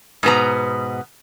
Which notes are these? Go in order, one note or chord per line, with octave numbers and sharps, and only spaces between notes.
G#2 B2 B3 A#5